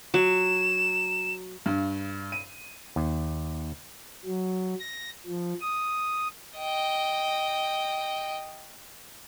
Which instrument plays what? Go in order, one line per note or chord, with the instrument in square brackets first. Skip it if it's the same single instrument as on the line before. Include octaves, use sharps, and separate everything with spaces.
[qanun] F#3 [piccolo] E7
[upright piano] G2
D#7
[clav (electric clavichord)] D#2
[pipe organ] F#3
A#6
F3
D#6
[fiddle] D#5 G5